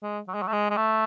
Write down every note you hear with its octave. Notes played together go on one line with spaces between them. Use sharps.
G#3
F#3
G#3
F#3
A3
G#3
G#3
A3